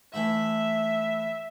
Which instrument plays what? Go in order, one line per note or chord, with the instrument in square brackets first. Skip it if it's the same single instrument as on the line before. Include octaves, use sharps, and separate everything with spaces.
[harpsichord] E3 A3 E4 [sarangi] E5